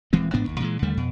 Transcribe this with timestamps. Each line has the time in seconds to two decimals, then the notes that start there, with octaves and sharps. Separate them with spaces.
0.13 D#1 E3 G#3 C4
0.33 A1 G#2 B3 D4
0.47 G#1 D#2
0.60 A#2 E3 G#3
0.82 D#2 D3 G3 A3
0.97 F2 B2